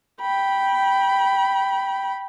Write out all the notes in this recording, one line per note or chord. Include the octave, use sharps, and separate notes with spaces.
G5 B5